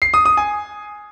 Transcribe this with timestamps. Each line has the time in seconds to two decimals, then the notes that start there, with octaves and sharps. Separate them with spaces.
0.02 C7
0.14 D#6
0.25 D#6
0.37 G#5